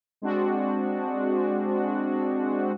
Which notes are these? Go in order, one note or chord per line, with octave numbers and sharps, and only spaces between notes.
G#3 C4 D4 F#4